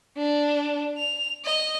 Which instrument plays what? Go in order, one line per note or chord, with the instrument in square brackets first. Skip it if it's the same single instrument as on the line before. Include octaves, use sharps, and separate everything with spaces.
[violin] D4
F7
D#5